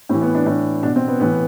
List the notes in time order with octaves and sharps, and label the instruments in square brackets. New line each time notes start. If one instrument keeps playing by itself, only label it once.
[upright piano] A2 C4
E3
B3
D4
A2 E3 D4
B2 D4
C4
B3
A2 E3 B3